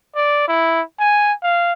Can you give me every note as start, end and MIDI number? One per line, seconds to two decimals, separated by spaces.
0.15 0.45 74
0.48 0.81 64
1.00 1.33 80
1.43 1.73 77